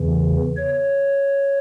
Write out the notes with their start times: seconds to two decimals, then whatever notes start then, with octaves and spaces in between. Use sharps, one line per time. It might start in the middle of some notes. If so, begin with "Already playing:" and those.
Already playing: E2 C#3 E3
0.56 C#5